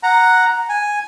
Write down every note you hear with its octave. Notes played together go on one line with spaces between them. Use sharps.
F#5 A#5
G#5